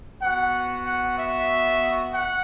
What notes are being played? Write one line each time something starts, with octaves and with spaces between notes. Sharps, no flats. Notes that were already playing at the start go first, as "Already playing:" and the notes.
B3 F#4 F#5
F#5
E5
F#5